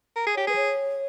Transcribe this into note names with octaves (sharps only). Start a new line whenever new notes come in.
A#4
G#4
G4 C#5
G#4 B4
C#5